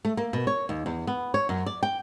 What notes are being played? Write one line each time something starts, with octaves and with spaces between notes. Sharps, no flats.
A3
A#3
B2
C#5
D#2
E2
B3
C#5
F#2
D5
G5